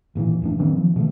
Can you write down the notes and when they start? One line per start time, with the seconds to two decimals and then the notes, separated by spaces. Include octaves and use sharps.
0.15 G#1 A#2 C#3 E3
0.42 E2 A2 D4
0.59 D#3 F#3 A#3 C4
0.78 F3
0.96 B2 D#3 G3 A3